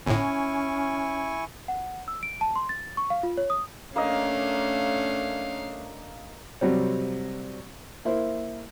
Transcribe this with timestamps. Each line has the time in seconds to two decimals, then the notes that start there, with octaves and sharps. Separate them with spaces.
0.07 G1 A2 C#4 E4 G#5 C#6
1.68 F#5
2.08 E6
2.23 D7
2.41 A5
2.56 C6
2.69 A6
2.97 C#6
3.10 F5
3.23 F4
3.37 C#5
3.50 D#6
3.96 A3 A#3 C#4 D4 D#5 F5
6.61 C3 F#3 G3 C4
8.05 A#3 E4 C5